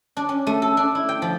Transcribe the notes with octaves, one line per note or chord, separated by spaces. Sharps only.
D4
C#4
A3
A4
D4
E4
G5
F3